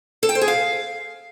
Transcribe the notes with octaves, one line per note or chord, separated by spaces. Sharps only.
A4
G5
C5
G#4
F5